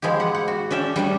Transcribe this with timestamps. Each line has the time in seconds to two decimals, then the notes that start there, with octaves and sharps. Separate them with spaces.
0.02 F3 G#3 E4 G4
0.20 F#5
0.34 F#5
0.48 F#4
0.71 C#4 D4 E5 G5
0.96 G3 A3 D4